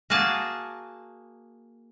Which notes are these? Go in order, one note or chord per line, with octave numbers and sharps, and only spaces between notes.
A#3 F#4 G#4 A5